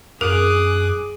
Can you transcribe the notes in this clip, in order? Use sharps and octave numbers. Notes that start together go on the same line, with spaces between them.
F#2 G#4 A#4 D6 D#6 F#6